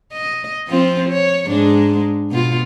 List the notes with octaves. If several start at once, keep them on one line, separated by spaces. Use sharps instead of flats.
D#5
F3 C4 F4
C#5
G#2 G#3 D4
B2 F4